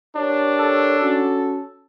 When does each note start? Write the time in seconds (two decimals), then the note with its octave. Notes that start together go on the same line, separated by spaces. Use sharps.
0.16 D4 G4 A#4 C#5
0.59 A4
1.00 C#4 F#4